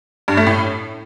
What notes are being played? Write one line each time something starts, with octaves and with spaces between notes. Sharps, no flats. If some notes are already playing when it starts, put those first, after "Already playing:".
G2
A3
A2